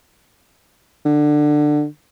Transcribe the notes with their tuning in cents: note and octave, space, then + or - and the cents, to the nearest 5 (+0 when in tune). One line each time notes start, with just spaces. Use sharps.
D3 +20